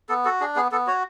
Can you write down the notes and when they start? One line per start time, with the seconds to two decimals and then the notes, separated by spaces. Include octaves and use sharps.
0.09 B3 A4
0.25 F#4 A4
0.40 D4 G#4
0.56 B3 G#4
0.72 B3 A4
0.87 F#4 C#5